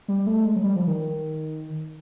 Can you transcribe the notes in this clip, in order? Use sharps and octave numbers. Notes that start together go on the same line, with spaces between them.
G3
A3
G#3
F#3
G3
F3
D#3